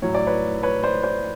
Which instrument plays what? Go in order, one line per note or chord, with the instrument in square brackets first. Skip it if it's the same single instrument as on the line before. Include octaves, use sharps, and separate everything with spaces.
[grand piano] A2 F#3 C#5
D5
B4 C#5
B4 C#5
C5 D5
C5 D5